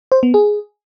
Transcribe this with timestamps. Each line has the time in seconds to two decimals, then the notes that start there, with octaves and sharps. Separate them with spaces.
0.12 C5
0.23 B3
0.34 G#4